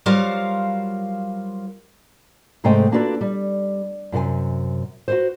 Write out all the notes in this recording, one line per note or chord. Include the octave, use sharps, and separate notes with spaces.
F#3 G3 F4 A#4 C5 F5
G#2 C3 G#3 A3 C5 G5
A#3 D4 F4 F#4 A4 B4
G3
F#2 C3 A4 G#5
F#4 B4 C5